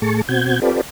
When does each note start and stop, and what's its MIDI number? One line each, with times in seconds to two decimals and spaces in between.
0.02 0.21 45
0.02 0.21 57
0.02 0.21 68
0.02 0.21 81
0.02 0.21 85
0.29 0.60 47
0.29 0.60 60
0.29 0.60 66
0.29 0.60 91
0.29 0.60 92
0.62 0.81 60
0.62 0.81 65
0.62 0.81 67
0.62 0.81 69
0.62 0.81 71
0.62 0.81 74